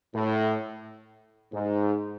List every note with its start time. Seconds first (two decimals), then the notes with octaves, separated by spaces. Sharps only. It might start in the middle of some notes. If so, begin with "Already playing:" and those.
0.14 A2
1.53 G#2